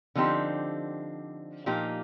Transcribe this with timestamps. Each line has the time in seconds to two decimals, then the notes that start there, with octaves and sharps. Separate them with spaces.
0.15 D3 F3 C4 D#4 G4
1.66 A#2 F3 A#3 D#4 G4